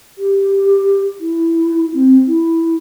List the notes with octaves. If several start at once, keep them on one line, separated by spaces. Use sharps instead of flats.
G4
E4
C4
E4